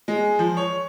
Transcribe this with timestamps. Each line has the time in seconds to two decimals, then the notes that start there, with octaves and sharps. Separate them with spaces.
0.08 G#3
0.39 F3
0.57 C#5